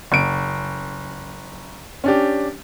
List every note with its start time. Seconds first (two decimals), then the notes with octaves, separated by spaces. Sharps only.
0.12 F#1 D7
2.04 C#4 D4 G4